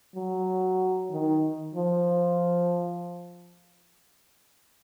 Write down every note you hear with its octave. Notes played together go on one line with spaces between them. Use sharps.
F#3
D#3
F3